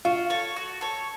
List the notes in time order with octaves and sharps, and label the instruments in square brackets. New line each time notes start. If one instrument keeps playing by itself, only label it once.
[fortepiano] F4 [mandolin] F#4
[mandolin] A4 C#5
F#4
A4 C#5